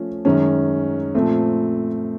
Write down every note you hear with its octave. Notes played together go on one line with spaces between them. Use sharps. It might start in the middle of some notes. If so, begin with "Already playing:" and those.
Already playing: F3 A3 C#4
F#2 D#3 G#3 C#4
A#2 F3 A3 C4